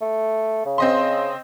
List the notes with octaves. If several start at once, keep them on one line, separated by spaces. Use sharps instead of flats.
A3
C#3
C4 D#5 C6